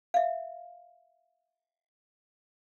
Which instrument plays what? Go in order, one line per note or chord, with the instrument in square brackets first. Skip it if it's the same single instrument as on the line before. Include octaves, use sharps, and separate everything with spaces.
[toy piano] E5 F5